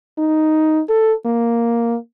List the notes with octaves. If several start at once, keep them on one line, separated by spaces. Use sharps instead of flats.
D#4
A4
A#3